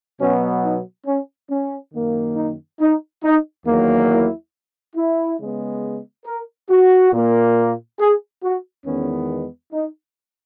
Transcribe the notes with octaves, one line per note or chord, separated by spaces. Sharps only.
B2 F#3 B3 C#4
D#4
C#4
C#4
F#2 D#3 A#3
D#4
D#4
D#4
E2 D#3 F#3 A#3
E4
E4
C#3 G#3 B3
A#4
F#4
A#2 A#3
G#4
F#4
E2 D#3 G#3 B3 C#4
D#4